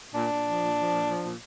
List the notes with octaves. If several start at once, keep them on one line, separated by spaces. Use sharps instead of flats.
A#2 D4
A#2
F3
A#2
F3
A#2
F3
A#2